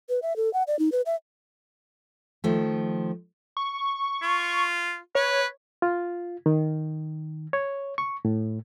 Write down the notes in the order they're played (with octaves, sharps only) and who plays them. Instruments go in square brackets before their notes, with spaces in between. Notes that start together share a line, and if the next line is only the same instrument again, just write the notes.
[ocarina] B4
E5
A4
F#5
D5
D#4
B4
E5
[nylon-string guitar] D#3 F3 A3
[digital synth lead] C#6
[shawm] F4
[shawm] B4 [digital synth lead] C#5
[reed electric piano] F4
D#3
C#5
C#6
A2